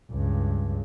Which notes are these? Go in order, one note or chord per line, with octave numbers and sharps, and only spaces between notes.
C#2 G2